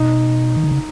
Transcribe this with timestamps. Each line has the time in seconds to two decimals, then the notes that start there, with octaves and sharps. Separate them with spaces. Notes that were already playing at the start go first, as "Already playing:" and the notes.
Already playing: B2 D#4
0.56 D#3
0.64 D3
0.71 C#3